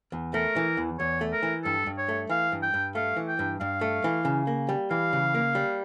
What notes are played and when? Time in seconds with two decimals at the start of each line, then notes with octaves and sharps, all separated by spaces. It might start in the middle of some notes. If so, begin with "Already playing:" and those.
0.12 E2
0.34 A3 A#4
0.56 E3
0.77 E2
0.99 E2 C#5
1.21 A3
1.33 A#4
1.43 E3
1.64 G2 A4
1.86 G2
1.98 C#5
2.09 A3
2.29 E3 F5
2.52 G2
2.63 G5
2.74 G2
2.95 A3 F5
3.17 E3
3.28 G5
3.39 G2
3.61 G2 F5
3.81 A3
4.04 E3
4.25 C#3
4.47 A#3
4.69 G3
4.91 E3 F5
5.13 C#3
5.34 A#3
5.55 G3